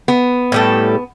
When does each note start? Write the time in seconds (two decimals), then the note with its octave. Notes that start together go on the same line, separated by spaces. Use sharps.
0.08 B3
0.52 A2 G3 A4